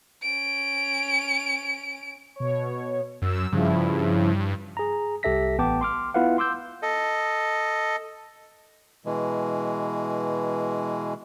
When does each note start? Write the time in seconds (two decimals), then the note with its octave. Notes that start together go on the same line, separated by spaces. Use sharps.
0.23 C#4 D7
2.36 B2 C#5
3.22 F#2 E6
3.52 G2 C#3 F3 E4
4.77 G#4 A#5
5.23 C2 G4 A4 E5 A#6 B6
5.58 A1 B3 G5 A5 D6
5.81 C6 D6 F6
6.14 B3 E4 F4 B4 F5 F#5
6.38 C6 D6 E6 G6
6.82 A4 D#5
9.06 B2 E3 G#3